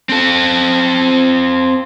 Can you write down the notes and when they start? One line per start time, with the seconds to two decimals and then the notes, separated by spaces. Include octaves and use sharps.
0.10 C4 A4